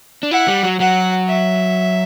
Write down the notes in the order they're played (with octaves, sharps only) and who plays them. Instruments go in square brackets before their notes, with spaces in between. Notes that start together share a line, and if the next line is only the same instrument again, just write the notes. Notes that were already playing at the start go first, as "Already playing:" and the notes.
[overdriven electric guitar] D4
[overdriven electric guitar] E4 [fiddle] F#5
[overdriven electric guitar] G3
F#3
[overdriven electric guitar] F#3 [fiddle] F#5
[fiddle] E5